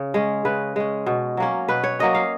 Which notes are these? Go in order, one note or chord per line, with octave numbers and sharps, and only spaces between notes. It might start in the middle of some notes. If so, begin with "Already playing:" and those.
Already playing: C#3
G#3 C#4
C#3 B4
G#3 C#4
B2
F#3 A#3 C#4
B2 B4
C#5
F#3 A#3 C#4 D#5
F5